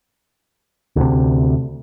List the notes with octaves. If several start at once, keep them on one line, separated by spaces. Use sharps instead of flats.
D2 C3